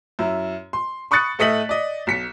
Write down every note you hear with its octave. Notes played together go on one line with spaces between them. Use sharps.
F#2 E4
C6
B5 C#6 D#6 F#6 A6 C#7
A2 A3 D#5 B6 F#7
D5 D#5
B1 B6 C#7